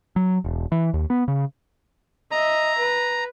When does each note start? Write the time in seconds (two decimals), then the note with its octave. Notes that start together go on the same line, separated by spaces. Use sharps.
0.16 F#3
0.44 E1
0.72 E3
0.94 D#2
1.10 B3
1.28 C#3
2.31 D#5 E5 A#5
2.78 B4